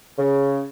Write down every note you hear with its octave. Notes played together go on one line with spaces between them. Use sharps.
C#3